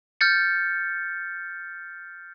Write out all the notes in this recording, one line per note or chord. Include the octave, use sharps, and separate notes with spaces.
F6 G6 A6 C#7